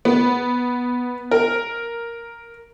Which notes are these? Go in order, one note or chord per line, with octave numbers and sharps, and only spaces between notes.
B3
A#4